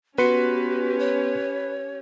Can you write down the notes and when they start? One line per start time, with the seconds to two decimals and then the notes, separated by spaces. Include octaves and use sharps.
0.18 B3 C#4 F#4 G4 B4 C6 C#7
0.99 C#5